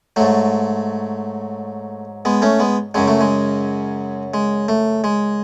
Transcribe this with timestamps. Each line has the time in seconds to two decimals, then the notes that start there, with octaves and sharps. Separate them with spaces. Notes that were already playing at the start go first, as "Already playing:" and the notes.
0.16 G#2 F#3 A3
2.25 G#3 B3
2.42 A3 C#4
2.60 G#3 B3
2.94 F#2 C#3 F#3 G#3
3.08 A3
3.21 G#3
4.34 G#3
4.68 A3
5.04 G#3